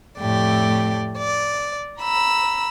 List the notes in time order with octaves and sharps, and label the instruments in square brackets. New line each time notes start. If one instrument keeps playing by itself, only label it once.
[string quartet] F2 A2 A3 G4 D5
D5
A#5 B5 E6